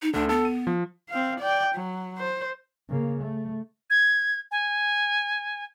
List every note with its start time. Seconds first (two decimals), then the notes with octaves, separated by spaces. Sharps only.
0.02 D#4
0.13 D2 D3 D4
0.29 B3 A4
0.45 D#7
0.67 F3
1.09 C4 F5
1.40 D5 G5
1.75 F#3
2.18 C5
2.89 C#3 A#3
3.21 A3
3.90 G#6
4.51 G#5